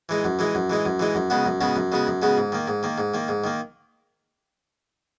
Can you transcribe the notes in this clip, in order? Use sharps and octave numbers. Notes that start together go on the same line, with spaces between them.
E3 G#3 D#4
F#2
E3 G#3 D#4
F#2
E3 G#3 D#4
F#2
E3 G#3 D#4
F#2
C#3 G#3 B3 F#4
F#2
C#3 G#3 B3 F#4
F#2
C#3 G#3 B3 F#4
F#2
C#3 G#3 B3 F#4
G#2
D#3 A#3
G#2
D#3 A#3
G#2
D#3 A#3
G#2
D#3 A#3